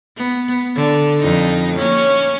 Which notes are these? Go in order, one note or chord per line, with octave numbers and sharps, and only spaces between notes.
B3
D3
F2 D#4
A#3 C#4